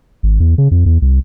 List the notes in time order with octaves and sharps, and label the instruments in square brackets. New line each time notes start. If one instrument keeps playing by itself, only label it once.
[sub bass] G#1
E2
C#3
F2
E2
C2